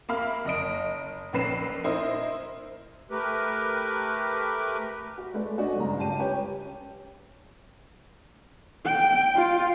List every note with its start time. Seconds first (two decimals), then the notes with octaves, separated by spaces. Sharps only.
0.09 A#3 E5 F5 B5 F6
0.45 F#1 D#5 D7
1.33 A#1 A#3 C#4 B4 C7 E7
1.84 E4 A#4 C5 D#5
3.11 A3 G4 A#4 B4
5.18 F#4
5.34 G#3 A3 B4 D5
5.57 A3 C#4 D4 F#4 D5 D#5
5.76 F#1 G2 A#5
5.97 C#2 G4 A5 D#7
6.19 C#4 G4 B4 C#5
8.85 G5
9.35 F4